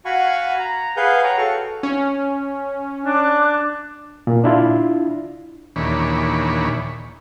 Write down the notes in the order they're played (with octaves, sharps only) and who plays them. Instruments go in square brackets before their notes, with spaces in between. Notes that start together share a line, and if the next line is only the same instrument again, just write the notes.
[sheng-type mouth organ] F#4 F5 F#5 G#5 B5 C#6
A#5
G#4 B4 F5 F#5 G#5 G6
C#5 F#5 G5 A#5
F#4 A4 F5 C#6
[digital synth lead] C#4
[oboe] D4 [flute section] D6 F#6
[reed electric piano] A#2
D4 E4 F4
[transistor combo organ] D#2 A#2 E3 D4 C#5 B5